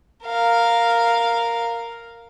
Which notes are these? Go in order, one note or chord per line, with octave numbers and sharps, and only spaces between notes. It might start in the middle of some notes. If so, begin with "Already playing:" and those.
A#4 F5